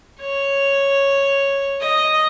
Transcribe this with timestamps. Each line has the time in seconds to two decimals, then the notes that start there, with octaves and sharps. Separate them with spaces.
0.19 C#5
1.81 D#5